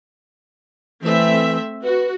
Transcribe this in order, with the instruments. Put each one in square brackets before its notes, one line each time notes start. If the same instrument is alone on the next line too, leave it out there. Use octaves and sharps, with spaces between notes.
[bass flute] E3 [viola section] A3 C4 E5
[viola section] F#4 [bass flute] B4